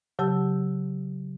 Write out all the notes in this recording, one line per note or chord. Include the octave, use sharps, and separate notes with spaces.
C#3 F#3 G4 A5 E6